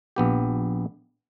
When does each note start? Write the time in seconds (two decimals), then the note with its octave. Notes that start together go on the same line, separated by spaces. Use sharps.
0.16 A#1 B3 G4